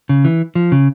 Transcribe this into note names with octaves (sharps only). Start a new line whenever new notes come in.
C#3
E3
F3
C#3